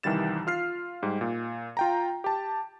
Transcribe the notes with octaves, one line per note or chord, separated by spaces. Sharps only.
C2 D#3 E3 G3 A6 E7
F4 F6 C7
G#2 G3
A#2
F4 G5 A#5
G4 A5